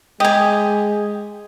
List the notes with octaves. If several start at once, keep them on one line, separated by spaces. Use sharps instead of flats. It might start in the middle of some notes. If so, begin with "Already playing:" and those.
G#3 G4 D#5 G#5